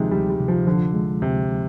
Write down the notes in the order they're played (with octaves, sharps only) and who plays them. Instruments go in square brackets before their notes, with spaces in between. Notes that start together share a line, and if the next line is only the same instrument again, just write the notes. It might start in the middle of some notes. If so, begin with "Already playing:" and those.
Already playing: [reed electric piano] D2 F3 [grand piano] C3 D#3 G#3
[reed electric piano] D2 [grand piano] G3
[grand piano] G3
[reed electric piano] C3
[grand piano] F3
[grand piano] D3 [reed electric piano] F3
[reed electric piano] G#3
[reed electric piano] D2 [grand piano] C3